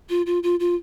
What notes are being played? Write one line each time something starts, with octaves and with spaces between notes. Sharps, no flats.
F4
F4
F4
F4